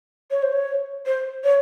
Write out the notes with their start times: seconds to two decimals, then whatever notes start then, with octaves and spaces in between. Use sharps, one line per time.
0.31 C#5
0.42 C5
0.52 C#5
1.06 C5
1.44 C#5